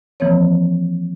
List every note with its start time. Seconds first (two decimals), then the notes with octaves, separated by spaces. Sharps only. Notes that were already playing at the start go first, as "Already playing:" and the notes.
0.20 E3 F3 A#3 C4 C#5